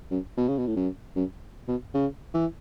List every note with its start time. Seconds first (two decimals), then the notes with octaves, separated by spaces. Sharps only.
0.11 F#2
0.37 B2
0.48 C#3
0.58 B2
0.67 A2
0.76 F#2
1.16 F#2
1.68 B2
1.94 C#3
2.34 E3